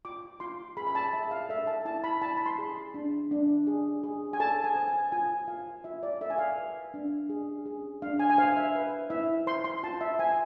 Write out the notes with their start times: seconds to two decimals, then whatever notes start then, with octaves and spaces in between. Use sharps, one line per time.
0.05 F4 D6
0.40 F4 C6
0.77 G#4 B5
0.87 B5
0.95 A5
1.13 G#4 E5
1.31 F5
1.49 A4 E5
1.67 A5
1.85 E4 A5
2.04 B5
2.21 E4 A5
2.37 B5
2.46 C6
2.58 G#4
2.94 D4
3.31 D4
3.67 G#4
4.04 G#4
4.33 G#5
4.40 A4 A5
4.64 G#5
4.76 C5
4.88 G#5
5.12 F4 G#5
5.48 F4 F5
5.84 F4 E5
6.03 D5
6.21 A4 E5
6.30 G#5
6.38 F5
6.57 B4
6.94 D4
7.29 G#4
7.66 G#4
8.02 D4 F5
8.19 G#5
8.30 G#5
8.38 C5 F5
8.57 E5
8.75 B4
9.10 E4 E5
9.47 C5 C6
9.64 C6
9.83 F4 A5
10.01 E5
10.19 C5 G#5